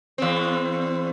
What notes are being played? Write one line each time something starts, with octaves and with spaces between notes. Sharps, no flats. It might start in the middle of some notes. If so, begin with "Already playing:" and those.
E2 C4